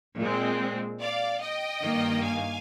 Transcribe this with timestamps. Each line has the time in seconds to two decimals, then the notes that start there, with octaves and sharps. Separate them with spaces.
0.18 A#2 G#3 C4
1.01 D5 F5
1.41 D#5 G5
1.82 G2 D#3 A#3
2.24 F5 G#5